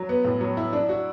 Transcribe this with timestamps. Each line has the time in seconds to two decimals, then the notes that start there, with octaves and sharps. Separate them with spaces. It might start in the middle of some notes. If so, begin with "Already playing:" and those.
Already playing: F#3
0.09 B3
0.25 A2
0.41 F#3
0.57 E4
0.73 D4
0.89 F#4